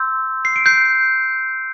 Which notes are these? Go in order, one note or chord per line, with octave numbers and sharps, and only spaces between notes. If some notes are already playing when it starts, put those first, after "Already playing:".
Already playing: C6 E6 G6
C7
D7
G6 C7